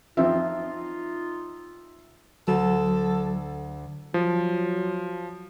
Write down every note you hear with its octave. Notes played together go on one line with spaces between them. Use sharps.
F3 C4 D#4 F4 E5
D2 F#3 A4
F3 F#3